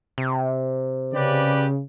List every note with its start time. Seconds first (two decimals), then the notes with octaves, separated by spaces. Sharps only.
0.18 C3
1.14 C#3 G4 B4 D5